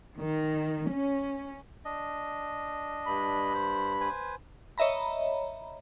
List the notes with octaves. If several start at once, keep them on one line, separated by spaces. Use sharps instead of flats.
D#3
C#4
D4 D#5
G2 B5
C5
B4 C5 G#5
C#5 D#5 E5 A#5 B5